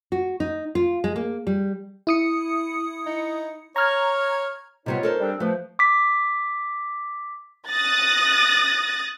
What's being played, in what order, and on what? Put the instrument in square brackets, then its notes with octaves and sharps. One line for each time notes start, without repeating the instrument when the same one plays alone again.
[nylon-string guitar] F#4
D#4
F4
G#3
A#3
G3
[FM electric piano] E4 D#6 C#7
[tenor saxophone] D#4
[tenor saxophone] C#5 [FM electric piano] A#5 F6 G#6
[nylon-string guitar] C3 G3 B3 [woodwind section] D#4 F4 C#5
[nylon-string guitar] A4 A#4 C5
[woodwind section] G3 C4 D4
[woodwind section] F3 [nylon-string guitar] A3 B4
[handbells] D6 B6
[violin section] D#6 F#6 A6 A#6